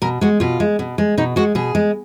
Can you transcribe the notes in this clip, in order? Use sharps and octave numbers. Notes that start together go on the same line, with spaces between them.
B2 A#4
G#3 F#4
B2 F4
G#3
B2
G#3
B2 D#4
G#3 F#4
B2 G#4
G#3